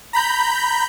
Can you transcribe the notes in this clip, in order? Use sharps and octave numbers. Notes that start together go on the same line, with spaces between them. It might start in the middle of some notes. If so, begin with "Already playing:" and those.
A#5 B5 G6